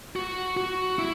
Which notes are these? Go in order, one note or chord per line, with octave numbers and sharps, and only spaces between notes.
F#4
F#4
E4